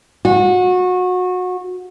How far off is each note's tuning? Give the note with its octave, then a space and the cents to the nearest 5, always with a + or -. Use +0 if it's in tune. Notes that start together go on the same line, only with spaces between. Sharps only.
F#4 -25